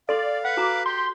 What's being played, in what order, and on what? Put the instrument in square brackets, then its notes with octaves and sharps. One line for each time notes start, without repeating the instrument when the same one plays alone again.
[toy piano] A4 C6 [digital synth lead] D5 [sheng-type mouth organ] F5
[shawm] B4 [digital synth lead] F#5
[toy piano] F#4 A#5 [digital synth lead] D6
[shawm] G4 [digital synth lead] C6